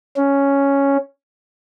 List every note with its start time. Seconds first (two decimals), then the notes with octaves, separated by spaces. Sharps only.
0.16 C#4